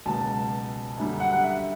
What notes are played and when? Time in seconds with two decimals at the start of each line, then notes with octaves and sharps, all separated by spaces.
0.05 C#2 B2 F#3 A5
0.97 F#2 D3 G3
1.20 F#5
1.32 F#5
1.44 E5